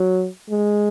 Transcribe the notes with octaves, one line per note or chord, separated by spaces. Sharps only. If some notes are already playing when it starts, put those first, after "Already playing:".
Already playing: F#3
G#3